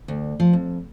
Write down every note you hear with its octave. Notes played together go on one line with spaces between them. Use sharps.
D2
F3
F2